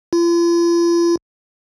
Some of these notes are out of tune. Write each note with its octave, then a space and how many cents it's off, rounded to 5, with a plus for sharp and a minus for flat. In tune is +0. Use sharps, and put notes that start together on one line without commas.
F4 -40